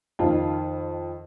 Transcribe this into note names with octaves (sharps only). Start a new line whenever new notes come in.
F2 D#3 F4